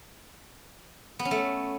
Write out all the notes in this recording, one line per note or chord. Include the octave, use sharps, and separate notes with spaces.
B3
C#4
A3